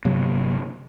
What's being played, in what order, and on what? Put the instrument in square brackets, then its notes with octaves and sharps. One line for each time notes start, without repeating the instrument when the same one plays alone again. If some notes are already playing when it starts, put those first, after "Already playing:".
[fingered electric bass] G1 C3 F#3 A#3